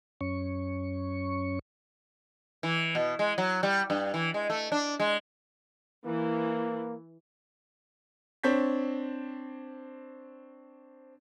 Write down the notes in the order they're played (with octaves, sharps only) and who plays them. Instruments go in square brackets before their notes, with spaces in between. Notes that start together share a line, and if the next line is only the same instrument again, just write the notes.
[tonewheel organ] F#2 C#4 C#6
[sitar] E3
B2
G#3
F#3
G3
G2
E3
G#3
A3
D4
G#3
[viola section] E3 [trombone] A#3
[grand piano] C4 D4 C#5 G6 B6